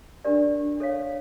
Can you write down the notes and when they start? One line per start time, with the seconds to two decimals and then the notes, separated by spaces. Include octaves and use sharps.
0.25 D4 G4 A#4 D5
0.80 A4 C#5 F5